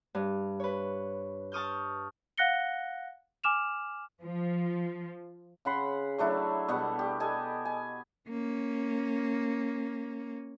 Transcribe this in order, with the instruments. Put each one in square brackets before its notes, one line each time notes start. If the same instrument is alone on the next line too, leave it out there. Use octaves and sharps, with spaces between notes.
[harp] G2
B4 C#5
A5 C#6 D#6 F6 G6
[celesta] F5 F#5 F#6 A#6 C#7 G7
G#5 D6 F6 E7 F7
[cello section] F3
[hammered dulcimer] C#3 F#5 B5 C6
F#3 A3 D4 E4
B2 G3 B3 F#5
G4
G4 A4 D#5 G#5
G#5
[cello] A#3 C#4